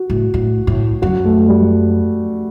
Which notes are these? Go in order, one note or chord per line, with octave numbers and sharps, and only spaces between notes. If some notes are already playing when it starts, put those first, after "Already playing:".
Already playing: F#4
A2
A2
A2
F#2 F#4
A3
G3